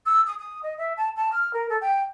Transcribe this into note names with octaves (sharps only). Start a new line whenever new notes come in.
E6
D#6
D#6
D#5
E5
A5
A5
F6
A#4
A4
G5